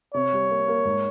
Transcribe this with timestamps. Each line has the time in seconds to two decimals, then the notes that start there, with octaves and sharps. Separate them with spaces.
0.14 C3 C#5
0.33 G3
0.50 A#3
0.68 A#3
0.85 G#2